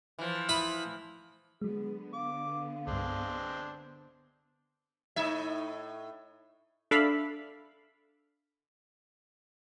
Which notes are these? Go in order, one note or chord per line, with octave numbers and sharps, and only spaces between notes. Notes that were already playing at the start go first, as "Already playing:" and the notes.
E3 F3
E4 B5 D#6
D3 F#3 G#3 B3 G#4
F5 D6
C2 G2 G#3 C4 D4
A2 D#4 E5
D4 A4 E5 F5 B5